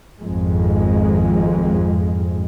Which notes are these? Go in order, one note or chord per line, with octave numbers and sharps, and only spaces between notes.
G#1 F2 G#3